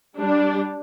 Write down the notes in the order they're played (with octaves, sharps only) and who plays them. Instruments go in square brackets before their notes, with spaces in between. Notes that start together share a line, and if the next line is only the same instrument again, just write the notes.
[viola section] G3 D4